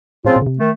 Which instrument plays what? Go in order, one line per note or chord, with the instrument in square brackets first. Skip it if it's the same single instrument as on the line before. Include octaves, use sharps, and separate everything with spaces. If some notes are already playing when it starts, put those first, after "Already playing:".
[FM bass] A2 [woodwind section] C#3 F3 C4 F4
[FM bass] A#2
C#3
C3
[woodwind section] D#3 A3